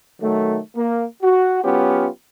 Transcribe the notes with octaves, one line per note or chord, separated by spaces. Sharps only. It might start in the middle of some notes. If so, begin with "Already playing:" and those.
D#3 F#3 A3
A#3
F#4
F#3 B3 C#4 F4 G4